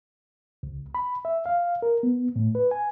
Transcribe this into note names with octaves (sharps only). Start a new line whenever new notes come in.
C#2
B5
E5
F5
A#4
B3
A2
B4
G#5